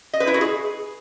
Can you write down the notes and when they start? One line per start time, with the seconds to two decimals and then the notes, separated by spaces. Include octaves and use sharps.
0.13 D#5
0.20 B4
0.27 E4
0.34 F#4
0.41 G#4